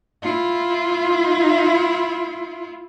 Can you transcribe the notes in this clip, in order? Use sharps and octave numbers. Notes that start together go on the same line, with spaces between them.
E4 F4